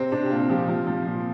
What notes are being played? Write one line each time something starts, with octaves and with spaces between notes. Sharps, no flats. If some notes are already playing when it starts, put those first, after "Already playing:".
Already playing: C3 C4
C3 D4
G4
A#2 F4
F3 G4
F3 F4
F3
A#2